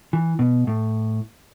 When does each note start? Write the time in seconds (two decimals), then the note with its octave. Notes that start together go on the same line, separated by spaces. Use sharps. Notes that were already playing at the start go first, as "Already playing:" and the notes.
0.13 E3
0.39 B2
0.67 A2